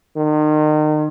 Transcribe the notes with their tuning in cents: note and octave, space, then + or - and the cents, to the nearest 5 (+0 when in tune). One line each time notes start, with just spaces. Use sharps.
D#3 -35